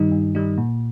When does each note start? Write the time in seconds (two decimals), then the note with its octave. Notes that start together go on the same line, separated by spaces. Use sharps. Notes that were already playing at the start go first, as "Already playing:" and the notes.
Already playing: G2 D#3 G3 D#4
0.12 G2
0.35 D#3 G3 D#4
0.58 A#2